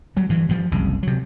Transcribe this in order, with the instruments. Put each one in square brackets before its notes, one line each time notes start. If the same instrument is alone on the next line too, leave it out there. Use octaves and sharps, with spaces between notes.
[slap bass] F#3 G3
G2 E3
G2 F3
F#1 C2 C#3
C3 F#3